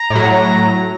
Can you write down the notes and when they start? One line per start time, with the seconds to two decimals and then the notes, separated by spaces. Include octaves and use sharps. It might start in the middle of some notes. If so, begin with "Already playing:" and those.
Already playing: A#5
0.10 A2
0.15 F#3